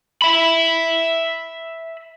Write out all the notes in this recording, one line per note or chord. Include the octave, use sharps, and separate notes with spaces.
E5 B5